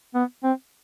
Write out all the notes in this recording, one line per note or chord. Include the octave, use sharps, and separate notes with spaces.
B3
C4